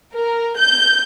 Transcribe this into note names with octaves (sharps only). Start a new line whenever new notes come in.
A#4
G6